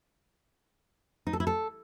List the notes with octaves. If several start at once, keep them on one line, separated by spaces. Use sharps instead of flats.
D#4
A4
E4
A4